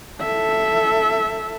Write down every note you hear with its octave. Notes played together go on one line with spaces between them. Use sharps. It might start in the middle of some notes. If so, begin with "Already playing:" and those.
A4 E5